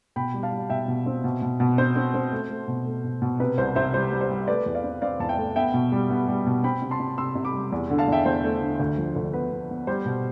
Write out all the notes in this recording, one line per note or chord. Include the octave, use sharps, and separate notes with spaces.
B2 G5 B5
G3
F5 A5
G3
B2 E5 G5
B2
C4
B2
B2
B2
C4 C5
C4
C4
A3
A3
B2
A3
B2
B2
C3 B4
C2 C5
C3 C5 E5
G3 C5
G3
C5
G3
A3 B4 D5
E2
D5 F5
C4
C4 D5 F5
E2 A5
E5 G5
A3
B3 E5 G5
B2
G3
B3
G3
B2
C4 G5 B5
C3
A5 C6
C3
C3 C6 E6
C3
B5 D6
G3
E2
D3
F5 A5
E2 E5 G5
E2 C5
A3
D3
D2
F3
D2
B3 B4
B3
B3
G3 C5
B2